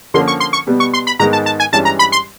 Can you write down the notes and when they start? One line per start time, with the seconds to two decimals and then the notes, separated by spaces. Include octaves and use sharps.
0.14 D3 F3 A#3 C#4 C6
0.28 C#6
0.40 C6
0.53 C#6
0.67 B2 G3 B3
0.80 C#6
0.93 C6
1.07 B5
1.19 G#2 D#3 G#3 B3 D#4 A#5
1.33 A5
1.46 A5
1.60 G#5
1.72 G2 E3 G#3 C#4 A5
1.85 A#5
1.99 B5
2.12 C6